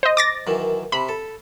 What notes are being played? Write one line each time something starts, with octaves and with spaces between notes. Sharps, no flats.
C5 D#5
D6 A6 A#6
F#2 D#3 E3
C3 B5
A4